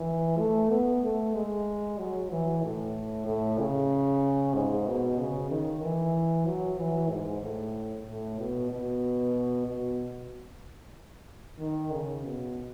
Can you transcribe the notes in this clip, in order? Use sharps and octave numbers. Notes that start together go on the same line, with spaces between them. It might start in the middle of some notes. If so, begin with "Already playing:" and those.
Already playing: E3
A3
B3
A3
G#3
F#3
E3
A2
A2
C#3
G#2
B2
C#3
D#3
E3
F#3
E3
G#2
A2
A2
B2
B2
B2
D#3
C#3
B2